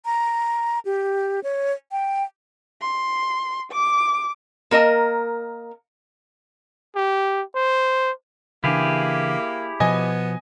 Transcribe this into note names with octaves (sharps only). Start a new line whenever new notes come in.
A#5
G4
C#5
G5
C6
D6
A#3 A#4 D#5 A5
G4
C5
C#3 E3 A#3 D4 E4 G4 G#4
B2 F3 B3 D#5 G#5